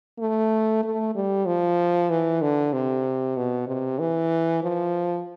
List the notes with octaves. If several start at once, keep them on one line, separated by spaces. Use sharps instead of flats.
A3
A3
G3
F3
E3
D3
C3
B2
C3
E3
F3